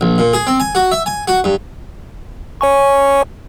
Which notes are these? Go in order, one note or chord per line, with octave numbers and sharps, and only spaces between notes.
A#1
A#2
G#4
C4
G#5
F#4
E5
G#5
F#4
G2
C#5 G#5 C#6